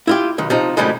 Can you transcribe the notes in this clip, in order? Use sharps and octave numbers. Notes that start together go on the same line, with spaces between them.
E4 F4 G4
B1 D#3
C3 F3 D#4
F#2 A2 C3 D#3 G3 G#3